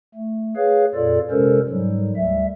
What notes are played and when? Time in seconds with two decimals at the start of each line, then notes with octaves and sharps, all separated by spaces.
0.15 A3
0.56 G#4 B4 C#5 F5
0.95 F2 A#2 F4 A4 D5
1.31 C3 G#3 C#4 A4 A#4 C5
1.69 G#2 F#3 G3
2.16 D2 G3 E5